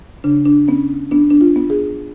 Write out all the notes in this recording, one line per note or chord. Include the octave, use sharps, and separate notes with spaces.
C#3 D4
D4
B3 C#4
B3 D4
D4
F4
B3
G#4